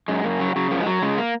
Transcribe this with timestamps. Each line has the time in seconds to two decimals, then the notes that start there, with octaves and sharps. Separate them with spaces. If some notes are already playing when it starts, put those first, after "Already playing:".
0.08 F#2 G#3
0.24 F#2 A#3
0.39 C#3 F#3
0.56 C#3 F#3
0.71 F#2 F3
0.81 G#3
0.86 F#2 F#3
1.02 C#3 G#3
1.18 A#3